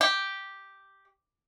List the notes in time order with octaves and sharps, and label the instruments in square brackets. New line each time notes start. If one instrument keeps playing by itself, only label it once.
[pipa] G4